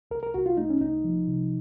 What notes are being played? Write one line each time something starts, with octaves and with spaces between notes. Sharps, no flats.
C2 A#4
A#4
C2 F#4
F4
A3 D#4
C#4
C2 D#4
F3
C3